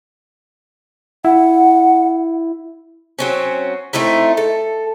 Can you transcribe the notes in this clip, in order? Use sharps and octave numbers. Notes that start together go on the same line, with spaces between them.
E4 F#5
F#3 C4 C#4
A3 C4 D#4 E4
A4